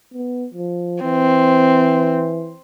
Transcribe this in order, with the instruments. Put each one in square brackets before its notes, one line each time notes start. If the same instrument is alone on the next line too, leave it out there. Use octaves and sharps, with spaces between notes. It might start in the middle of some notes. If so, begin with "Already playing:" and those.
[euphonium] B3
F3
[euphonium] E3 [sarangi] C4